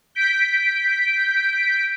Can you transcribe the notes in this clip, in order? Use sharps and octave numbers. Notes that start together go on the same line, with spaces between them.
G6 B6 D7